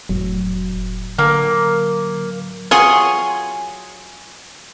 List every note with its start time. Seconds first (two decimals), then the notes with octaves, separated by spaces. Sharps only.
0.09 F1 A2 F#3
1.18 D3 A#3
2.71 F#3 F4 G#4 G#5 C6 C#6